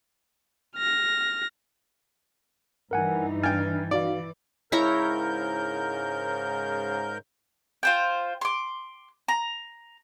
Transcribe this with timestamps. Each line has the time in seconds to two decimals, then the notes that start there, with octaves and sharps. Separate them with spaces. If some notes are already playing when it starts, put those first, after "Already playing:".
0.76 F6 A#6
2.91 G2 E3 D#4 A#4 F#5 G#5
3.43 D4 G5 G#5 F6 A6
3.91 E3 D#4 F#4 D5 F5
4.72 G#2 C#3 E4 A#4 C#5 A#5 G6
7.83 F4 C5 G5
8.41 C6 D6
9.28 A#5